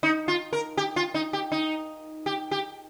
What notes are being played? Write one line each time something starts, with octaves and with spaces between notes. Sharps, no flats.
D#4
F4
A#4
G4
F4
D#4
G4
D#4
G4
G4